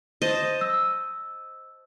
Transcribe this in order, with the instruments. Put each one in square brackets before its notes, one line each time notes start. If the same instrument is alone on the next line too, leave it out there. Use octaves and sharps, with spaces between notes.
[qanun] C5 D#5 A5
[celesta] E6